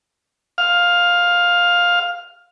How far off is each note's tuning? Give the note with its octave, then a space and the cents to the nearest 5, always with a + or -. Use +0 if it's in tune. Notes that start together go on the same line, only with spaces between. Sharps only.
F5 +10